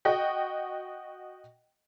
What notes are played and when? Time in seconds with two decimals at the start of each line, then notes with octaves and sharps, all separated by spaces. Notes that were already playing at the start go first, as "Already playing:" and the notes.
0.05 F#4 D#5 G5